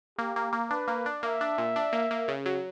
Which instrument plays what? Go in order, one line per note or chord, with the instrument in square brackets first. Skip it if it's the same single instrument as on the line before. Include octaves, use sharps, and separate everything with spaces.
[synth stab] A#3 [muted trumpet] G4
[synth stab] A#3
A#3
[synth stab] D4 [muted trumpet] B4
[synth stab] A#3
D4
[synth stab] A#3 [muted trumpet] E5
[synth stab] D4
A#2
D4
A#3
A#3
C#3
F#3